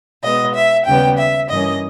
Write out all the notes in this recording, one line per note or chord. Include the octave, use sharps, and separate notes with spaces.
B2 G#3 B3 D#5
E5
D#2 C#3 G3 B3 G5
E5
G2 E3 A#3 C#4 D#5